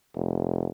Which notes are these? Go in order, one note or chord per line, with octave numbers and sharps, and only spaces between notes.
F1